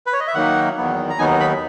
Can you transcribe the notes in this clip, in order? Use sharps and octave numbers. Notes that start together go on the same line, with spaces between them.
B4
C#5
D#5
E5
D#3 F#3 A#3 D#4 F#5
E2 D#3 F#3 B3
A#5
D#2 D#3 F#3 B3 D#4 G#5
B5